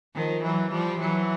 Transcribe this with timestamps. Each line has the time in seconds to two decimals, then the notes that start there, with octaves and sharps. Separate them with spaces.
0.15 D#3 F3
0.43 E3 F#3
0.71 F3 G3
0.99 E3 F#3